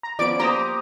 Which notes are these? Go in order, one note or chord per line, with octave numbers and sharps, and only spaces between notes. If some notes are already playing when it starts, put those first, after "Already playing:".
A#5
F3 B3 C#4 D5 D7
A#3 G4 C5 A#5 D6 D#6